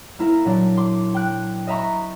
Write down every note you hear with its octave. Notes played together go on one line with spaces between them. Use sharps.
A#3 E4 A#4
A#2 F#3 D4
C6 D6
G5 F#6
D#5 E5 A#5 B5 C#6